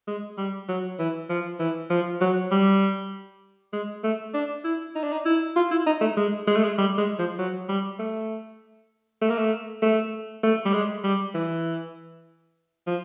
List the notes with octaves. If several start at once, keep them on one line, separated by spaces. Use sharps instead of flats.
G#3
G3
F#3
E3
F3
E3
F3
F#3
G3
G#3
A3
D4
E4
D#4
D4
D#4
E4
F4
E4
D#4
A3
G#3
G#3
A3
G#3
G3
G#3
F3
F#3
G3
A3
A3
A#3
A3
A3
A3
G3
G#3
G3
E3
F3